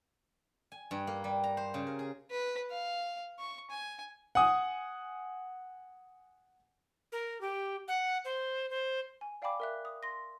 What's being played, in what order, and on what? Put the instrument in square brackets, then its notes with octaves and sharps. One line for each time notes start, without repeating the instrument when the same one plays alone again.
[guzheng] G#5
G2
A#3
G3
A#5
C5
C#3
A#4
G#4
[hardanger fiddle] B4
F5
C#6
G#5
[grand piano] F#5 G#5 D#6
[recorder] A#4
G4
F#5
C5
C5
[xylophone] G#5
D5 F5 G5 G#5 B5 D6
A#4 E5 F#6
D#6
C6 A#6